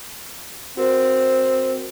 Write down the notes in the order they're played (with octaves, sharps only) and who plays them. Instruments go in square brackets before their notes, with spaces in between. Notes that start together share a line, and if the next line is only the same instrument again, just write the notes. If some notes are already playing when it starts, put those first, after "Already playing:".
[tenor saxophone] C4 [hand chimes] F#4 A#4